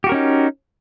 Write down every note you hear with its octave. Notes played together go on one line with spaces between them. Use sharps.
C#4 D#4 F#4 G4 A#4